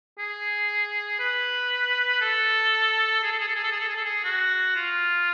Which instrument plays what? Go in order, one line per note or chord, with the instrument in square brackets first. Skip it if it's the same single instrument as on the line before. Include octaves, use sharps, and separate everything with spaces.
[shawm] G#4
B4
A4
G#4
A4
G#4
A4
G#4
A4
G#4
A4
G#4
A4
G#4
F#4
F4